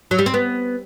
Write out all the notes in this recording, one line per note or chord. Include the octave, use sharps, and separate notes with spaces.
F#3
G3
C4
B3